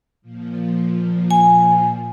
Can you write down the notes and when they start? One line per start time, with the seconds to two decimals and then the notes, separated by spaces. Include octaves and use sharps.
0.22 A#2 F3
1.31 G#5